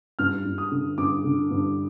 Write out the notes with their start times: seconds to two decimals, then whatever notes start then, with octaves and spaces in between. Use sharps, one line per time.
0.19 G2 F6
0.45 G2
0.58 D#6
0.71 D3
0.98 G2 D6
1.24 D3
1.51 G2